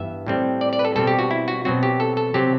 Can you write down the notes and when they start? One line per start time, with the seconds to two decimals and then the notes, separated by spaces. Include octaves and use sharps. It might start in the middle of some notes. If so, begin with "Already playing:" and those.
Already playing: G2 E3 B3 E5
0.27 A2 G3 C4
0.61 D5
0.73 D5
0.79 B4
0.85 A4
0.96 B2 G3 C4 A4
1.07 G4
1.19 F#4
1.31 E4
1.48 F#4
1.65 B2 F#3 C4 F#4
1.83 G4
2.00 A4
2.17 A4
2.34 C3 F#3 C4 G4